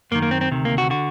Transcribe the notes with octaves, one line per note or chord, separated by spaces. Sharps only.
F#2 D#3 A#3
A#3
C4
C4
D2 C3 D#3
A#3
F#4
D3 F#4